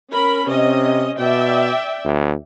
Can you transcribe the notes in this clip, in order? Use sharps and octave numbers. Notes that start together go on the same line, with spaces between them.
C#4 A#4 B5
C3 C4 C#4 D#5
B2 D5 E5 G5
D2